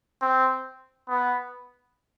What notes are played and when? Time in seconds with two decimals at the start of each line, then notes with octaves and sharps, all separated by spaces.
0.22 C4
1.08 B3